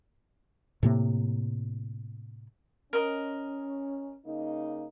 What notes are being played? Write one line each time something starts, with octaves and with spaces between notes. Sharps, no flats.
A2 C3 A#3
C#4 A#4 D#5
C#3 A#3 D#4